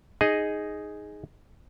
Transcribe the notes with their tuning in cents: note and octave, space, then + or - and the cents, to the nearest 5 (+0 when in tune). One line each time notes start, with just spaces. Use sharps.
D#4 +0 G#4 +0 D#5 +0